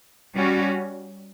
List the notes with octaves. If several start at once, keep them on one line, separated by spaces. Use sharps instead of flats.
G3 C#4 F#4